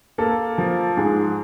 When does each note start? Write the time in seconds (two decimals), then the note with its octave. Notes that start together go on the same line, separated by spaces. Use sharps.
0.18 A#3 A4
0.58 F3
0.97 G#2 G#4